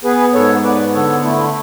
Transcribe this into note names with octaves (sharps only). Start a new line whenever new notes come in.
B3 G#4 B4
G#2 A4 C#5
B3 B4 D5
D3 A4 C#5
A3 E4